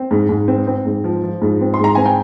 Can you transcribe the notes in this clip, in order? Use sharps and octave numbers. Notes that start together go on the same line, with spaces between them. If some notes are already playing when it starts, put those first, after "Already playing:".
Already playing: C4
G#2
G#2
C4
C4
G#2
F3
F3
G#2
C4
C6
G#2 A#5
C4 G#5
G5